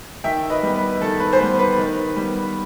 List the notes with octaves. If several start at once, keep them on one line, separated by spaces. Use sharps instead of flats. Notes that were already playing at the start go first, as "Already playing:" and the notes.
D#3 E5 G5
B4 D#5
G3 B3
B4
D#3 A4
B4
C5
G3 B3 B4
B4
D#3
G3 B3